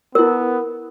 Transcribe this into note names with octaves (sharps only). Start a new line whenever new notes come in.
B3 E4 A#4